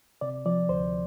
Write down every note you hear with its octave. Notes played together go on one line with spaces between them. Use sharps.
C3 D5
F3 D5
D2 C5